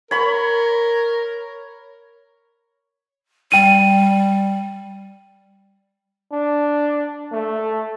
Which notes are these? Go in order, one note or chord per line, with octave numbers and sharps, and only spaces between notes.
A#4 C#5 B5 C#6
G3 G5 D#7
D4
A3